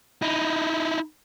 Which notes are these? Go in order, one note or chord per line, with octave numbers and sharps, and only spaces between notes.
D#4 E4